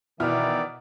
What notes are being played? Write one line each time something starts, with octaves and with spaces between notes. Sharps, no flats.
B2 D#3 E3 E4 D5 F6